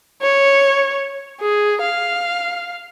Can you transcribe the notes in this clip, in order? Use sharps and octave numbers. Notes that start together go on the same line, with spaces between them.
C#5
G#4
F5